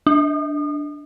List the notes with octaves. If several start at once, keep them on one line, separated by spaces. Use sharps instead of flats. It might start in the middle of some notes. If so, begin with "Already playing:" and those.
D4